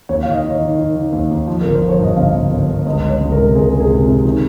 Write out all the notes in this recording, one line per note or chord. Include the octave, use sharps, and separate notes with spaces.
D#2 C#5
D#3 F5
D#5
D#3
C#5
D#5
D#3
D#3
D#3
D#2
D#2
F3
G1 A#4
C5
F3
C#5
G2 D#5
G1 F5
G1
G1
G1
C#2 D#5
C#2
C#5
C#2
A#4
C3
C#2 G#4
C#2 A#4
G#4
C3
C3
D#3